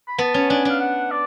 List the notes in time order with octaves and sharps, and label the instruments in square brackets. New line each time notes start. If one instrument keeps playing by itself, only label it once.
[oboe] B5
[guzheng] B3 [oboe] A5
[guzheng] C#4
[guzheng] D4 [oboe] G#5
[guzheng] D4 [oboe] F5
[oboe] F#5
D5